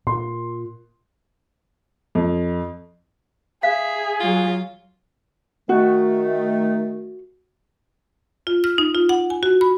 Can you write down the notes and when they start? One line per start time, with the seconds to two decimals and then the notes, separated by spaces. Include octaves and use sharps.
0.07 A#2 C6
2.15 F2
3.63 G#4 E5 F5
4.20 F#3 F4
5.69 D#3 A3 F#4
8.47 F4
8.64 F6
8.78 D#4
8.95 F4
9.09 F#5
9.30 G#5
9.43 F#4
9.61 B5